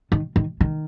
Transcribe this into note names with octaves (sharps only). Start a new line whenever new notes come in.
D#3
D#3
D#3